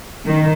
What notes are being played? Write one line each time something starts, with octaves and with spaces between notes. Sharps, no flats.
D#3